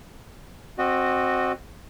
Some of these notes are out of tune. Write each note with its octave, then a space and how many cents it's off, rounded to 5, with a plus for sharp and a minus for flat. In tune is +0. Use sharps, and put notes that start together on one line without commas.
C4 +15 F#4 +0 D#5 -25